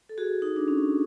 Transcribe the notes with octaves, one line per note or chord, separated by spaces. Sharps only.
A4
F#4 G#4
D#4
D4
C#4